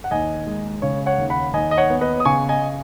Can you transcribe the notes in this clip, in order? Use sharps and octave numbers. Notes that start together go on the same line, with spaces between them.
F#5
D#2 D#5 G#5
G#3
C#3 C#5
C#5 F#5
D#2
F#5 B5
D#2 D#5 G#5
D#5
C#5 F#5
B3
B4 D#5
D#6
C#3 G#5 C#6
D#5 G#5